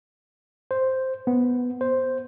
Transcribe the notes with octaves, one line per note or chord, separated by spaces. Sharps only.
C5
B3
C5